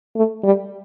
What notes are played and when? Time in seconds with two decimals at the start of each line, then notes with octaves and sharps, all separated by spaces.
0.16 A3
0.44 G3